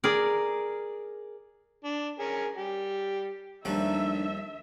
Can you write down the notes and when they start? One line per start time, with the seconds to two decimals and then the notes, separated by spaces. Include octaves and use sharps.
0.04 G#4 A#4 D5
1.84 D4
2.19 C#4 G#4 A#4
2.57 G3 G4
3.65 D#2 F3 G3 A3 D4 D#4 E5